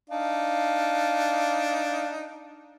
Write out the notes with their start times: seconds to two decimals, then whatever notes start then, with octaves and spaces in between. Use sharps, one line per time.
0.10 D4 D#4 F5